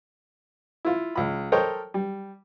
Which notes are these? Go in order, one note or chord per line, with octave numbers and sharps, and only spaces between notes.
E4 F4
C#2 B5
A4 A#4 C5 C#5 D#5 G5
G3